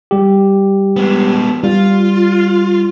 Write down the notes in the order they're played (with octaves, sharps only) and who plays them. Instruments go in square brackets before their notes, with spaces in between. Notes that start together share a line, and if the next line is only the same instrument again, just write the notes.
[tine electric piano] G3 G4
[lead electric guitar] G#3 B3
[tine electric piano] G3 [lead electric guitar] F4